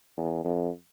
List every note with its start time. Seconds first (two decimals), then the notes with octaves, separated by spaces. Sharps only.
0.17 E2
0.44 F2